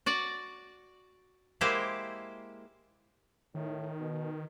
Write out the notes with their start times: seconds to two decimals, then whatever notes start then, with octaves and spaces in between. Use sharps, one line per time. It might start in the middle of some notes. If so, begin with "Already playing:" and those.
0.06 F#4 D5 F#5
1.61 G#3 A#3 E4 G4 C5
3.55 A2 D#3
3.99 B2